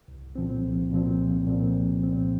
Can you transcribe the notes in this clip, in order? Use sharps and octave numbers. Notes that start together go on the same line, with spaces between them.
C2
A#2 F3 C4
C2
A#2 F3 C4
C2
A#2 F3 C4
C2
A#2 F3 C4